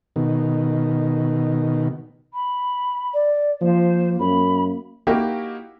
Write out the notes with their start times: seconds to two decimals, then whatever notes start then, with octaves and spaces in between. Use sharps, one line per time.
0.16 B2 D#3
2.34 B5
3.14 D5
3.61 F3 A#3 C5
4.19 F#2 B5
5.07 A#3 D#4 E4 F#4 G4